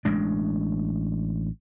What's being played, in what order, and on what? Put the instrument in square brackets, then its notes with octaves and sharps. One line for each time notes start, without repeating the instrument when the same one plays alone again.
[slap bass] A1 G#3 D4